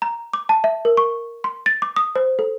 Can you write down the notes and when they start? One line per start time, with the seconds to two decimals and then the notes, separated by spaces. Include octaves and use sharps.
0.02 A#5
0.33 D6
0.49 A5
0.64 E5
0.85 A#4
0.97 C#6
1.44 C6
1.66 A6
1.82 D6
1.96 D#6
2.16 C5
2.39 A4